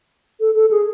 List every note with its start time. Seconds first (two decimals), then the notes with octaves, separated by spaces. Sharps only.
0.40 A4
0.55 A4
0.71 G#4